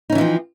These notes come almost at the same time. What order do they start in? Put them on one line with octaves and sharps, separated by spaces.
D#4 C#4 E3 F3 C4